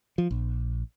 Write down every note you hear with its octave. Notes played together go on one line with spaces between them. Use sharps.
F3
A#1